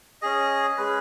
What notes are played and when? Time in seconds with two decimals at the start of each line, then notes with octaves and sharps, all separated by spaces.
0.22 C#4 G#4 D#5
0.78 G#3 C#4 G#4 B4